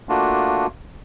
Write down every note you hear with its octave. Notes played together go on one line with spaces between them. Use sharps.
A3 A#3 D4 F4 F#4